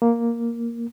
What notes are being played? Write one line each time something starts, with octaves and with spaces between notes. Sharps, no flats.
A#3